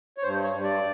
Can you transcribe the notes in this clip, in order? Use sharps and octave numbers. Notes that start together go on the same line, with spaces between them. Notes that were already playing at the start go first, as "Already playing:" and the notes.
C#5
G2 C5
C#5
G2
D5